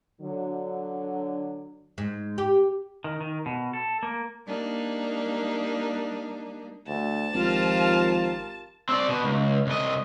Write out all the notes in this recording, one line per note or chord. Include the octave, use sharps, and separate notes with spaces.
D3 F#3
G#2
G4
D#3
D#3
B2
A4
A#3
G3 A#3 D4 D#4
D2 A5
G#1 F3 F4 G4 A#4
C4 D5
B2
C#2
C2 D#5